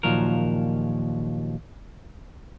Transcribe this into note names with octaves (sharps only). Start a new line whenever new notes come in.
D#2 A#2 F3 F#3 A#4